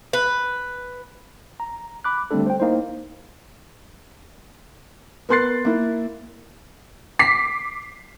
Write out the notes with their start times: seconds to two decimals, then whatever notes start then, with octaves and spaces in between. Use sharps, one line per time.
0.13 B4
1.60 A#5
2.04 B5 D6 F#6
2.31 D3 G3 A3 C4 D4 A4
2.46 C5 G5
2.60 A#3 D#4 E4 C5
5.29 B3 A#4 C6 F#6 A6 C7
5.65 A#3 E4
7.19 D6 B6 C7